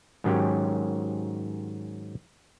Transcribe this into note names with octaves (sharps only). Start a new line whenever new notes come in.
G#2 D#3 F#3 C#4 G4